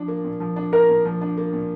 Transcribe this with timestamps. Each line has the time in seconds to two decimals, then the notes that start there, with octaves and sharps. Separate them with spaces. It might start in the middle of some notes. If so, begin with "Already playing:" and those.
Already playing: F3 D4
0.08 A#3
0.25 A#2
0.40 F3
0.56 D4
0.72 A#3 A#4
0.89 A#2
1.05 F3
1.21 D4
1.37 A#3
1.53 A#2